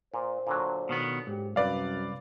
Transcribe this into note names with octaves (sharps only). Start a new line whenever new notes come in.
A#2 C5
A#2 D3 F#3
B2 D#3 B3
G#2 G4
C2 F#2 B4 D5 F5